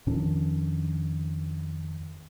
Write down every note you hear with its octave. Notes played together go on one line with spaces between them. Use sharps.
F2 D#3 C#4 D4